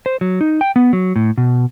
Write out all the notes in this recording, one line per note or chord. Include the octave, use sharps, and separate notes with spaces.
C5
F#3
D#4
G5
B3
F#3
A2
B2